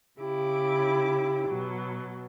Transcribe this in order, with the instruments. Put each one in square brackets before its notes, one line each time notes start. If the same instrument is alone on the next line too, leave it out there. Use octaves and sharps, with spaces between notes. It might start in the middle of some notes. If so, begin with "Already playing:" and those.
[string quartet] C#3 E4 D6 [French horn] G4
[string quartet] B2 F#3